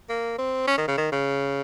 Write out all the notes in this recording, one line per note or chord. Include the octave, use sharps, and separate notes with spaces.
A#3
C4
C#4
D#3
C#3
D#3
C#3